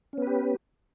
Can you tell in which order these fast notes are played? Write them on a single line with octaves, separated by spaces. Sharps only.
C#4 B3 B4 G4